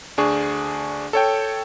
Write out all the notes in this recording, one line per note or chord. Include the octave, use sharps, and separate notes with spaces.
D2 D4 G#4 C#6
A4 C#5 G5